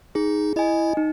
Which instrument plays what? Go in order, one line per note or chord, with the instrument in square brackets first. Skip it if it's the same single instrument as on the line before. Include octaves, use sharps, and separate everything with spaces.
[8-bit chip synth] D#4 [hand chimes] G#4
[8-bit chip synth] E4 [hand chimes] D#5 G#5
[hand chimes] D#4